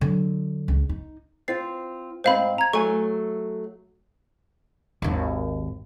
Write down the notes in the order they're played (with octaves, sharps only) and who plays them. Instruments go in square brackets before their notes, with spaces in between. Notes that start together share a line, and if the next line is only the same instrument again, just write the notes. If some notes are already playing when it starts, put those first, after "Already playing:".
[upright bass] D3 F#3
C#2
D#4
[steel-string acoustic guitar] C4 F4 [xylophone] C5 A6 C7
[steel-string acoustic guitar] G#2 C4 [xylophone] C5 F5 B5
[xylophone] A#5 G#6
[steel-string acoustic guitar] F#3 A3 [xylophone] G#5 C#6
[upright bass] G#1 D#2